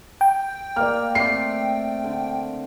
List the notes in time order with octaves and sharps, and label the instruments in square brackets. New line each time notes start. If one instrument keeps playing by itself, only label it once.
[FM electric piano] G5
[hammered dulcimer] A#3 [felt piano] D5 F6
[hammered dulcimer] A3 C4 D5 [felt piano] C7
[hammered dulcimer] D3